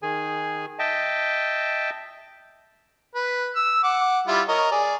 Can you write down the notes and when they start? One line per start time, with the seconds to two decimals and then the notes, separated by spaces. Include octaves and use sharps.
0.03 D#3 G#4 G#5
0.79 D#5 E5 G5 A5
3.15 B4
3.56 E6
3.84 F#5 D6
4.27 G3 E4 F4
4.48 A#4 C#5 D#5
4.72 G#4 D5